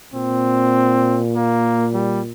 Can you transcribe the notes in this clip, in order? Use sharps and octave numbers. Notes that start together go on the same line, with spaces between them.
A#2 C4
A#3
G3